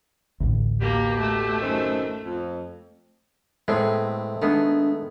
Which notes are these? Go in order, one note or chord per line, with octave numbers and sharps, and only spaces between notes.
A1 D2
B2 A#3 G4
A3
F#2 D#3 C4
F2
A2 G#3 A3 B3 C4
D#3 G#3 A3 B3 D4